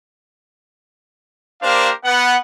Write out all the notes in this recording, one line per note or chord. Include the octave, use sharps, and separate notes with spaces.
A#3 D4 G4 A#4 C5 F5
B3 F#5